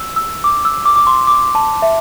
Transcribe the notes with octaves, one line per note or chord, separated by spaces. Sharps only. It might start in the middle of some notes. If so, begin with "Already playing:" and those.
Already playing: E6
E6
D6
E6
D6
D6
C6
D6
A5
E5